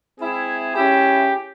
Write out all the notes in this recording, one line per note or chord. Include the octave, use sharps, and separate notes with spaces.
G#3 C4 E4 G#4
G#3 C#4 E4 G4